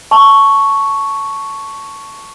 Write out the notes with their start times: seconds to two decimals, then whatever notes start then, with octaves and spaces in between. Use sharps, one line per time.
0.11 A5 C#6